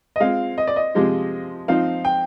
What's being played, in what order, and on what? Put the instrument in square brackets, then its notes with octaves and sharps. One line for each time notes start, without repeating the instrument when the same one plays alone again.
[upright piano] D#5
[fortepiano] G#3 C4 F4 [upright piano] F5
[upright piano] D#5
D5
D#5
[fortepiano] C3 F3 G#3 C4 G4
[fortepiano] F3 C4 D#4 [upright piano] F5
[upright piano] G5